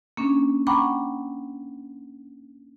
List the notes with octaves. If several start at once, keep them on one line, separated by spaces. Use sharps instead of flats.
A#3 C#4 D4
F#5 G5 A#5 B5 C#6 D6